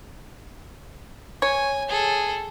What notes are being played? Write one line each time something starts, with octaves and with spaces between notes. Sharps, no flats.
C#5 G#5
G#4 A4